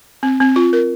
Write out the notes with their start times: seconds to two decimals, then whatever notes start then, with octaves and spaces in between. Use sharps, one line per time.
0.23 C4
0.40 C4
0.56 F4
0.73 A#4